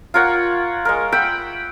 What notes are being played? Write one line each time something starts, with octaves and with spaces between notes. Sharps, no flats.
F4 A#4 C#5 F#5
G#3 A#4
F#5 G5 B5 E6